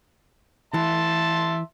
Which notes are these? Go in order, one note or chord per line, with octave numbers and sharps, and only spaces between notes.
E3 E5 A5 C6